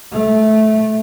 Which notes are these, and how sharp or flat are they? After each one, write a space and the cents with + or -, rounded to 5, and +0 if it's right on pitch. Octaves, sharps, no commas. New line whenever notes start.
A3 -15